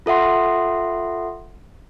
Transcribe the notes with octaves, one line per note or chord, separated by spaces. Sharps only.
F4 A4 E5 F#5 C6